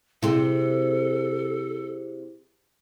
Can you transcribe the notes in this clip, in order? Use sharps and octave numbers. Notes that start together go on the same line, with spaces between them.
C3 C4 E4 G#4 A4